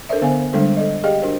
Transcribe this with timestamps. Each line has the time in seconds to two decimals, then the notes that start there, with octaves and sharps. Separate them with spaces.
0.09 D4 A4 A#4 C5 D5 E5
0.22 D3 B3 C5 F5 G#5
0.53 D3 G3 G#3 D4 A4 C5
0.76 A4 D5 D#5
1.04 G4 G#4 D5 D#5 F5 G5
1.22 D4 F#4 A#4 C5